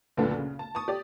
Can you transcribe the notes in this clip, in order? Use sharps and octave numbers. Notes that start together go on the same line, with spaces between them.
F#1 D2 A#2 D3 B3 A4
C#3
A5
A5 C#6 D#6
G4 D5